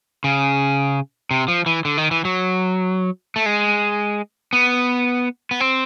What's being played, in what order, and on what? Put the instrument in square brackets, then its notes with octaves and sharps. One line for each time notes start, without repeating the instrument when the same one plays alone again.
[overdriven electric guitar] C#3
C3
F3
E3
D3
D#3
E3
F#3
A3
G#3
B3
B3
C4